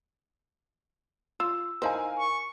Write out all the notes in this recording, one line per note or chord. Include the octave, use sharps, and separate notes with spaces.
F4 E6
D#4 E4 A#4 C5 F5 G#5
C#6